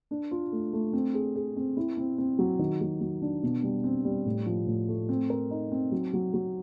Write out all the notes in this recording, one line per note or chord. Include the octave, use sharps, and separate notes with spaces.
D4
F4
A3
A3
C4
G#4
G#4
C4
E4
C4
C4
F#3
D#3
F#3
F#3
D4
B2
G3
C4
G3
A2
F3
A2
A3
C4
A#4
D#4
C4
F#3
F#3
F#3